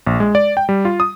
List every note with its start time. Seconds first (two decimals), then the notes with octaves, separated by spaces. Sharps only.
0.07 A#1
0.20 G#3
0.35 D5
0.57 G5
0.69 G3
0.85 F4
1.00 D#6